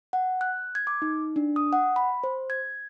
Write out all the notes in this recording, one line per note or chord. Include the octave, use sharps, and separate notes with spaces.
F#5
F#6
G#6
D6
D#4
D4
D#6
F#5
B5
C5
G#6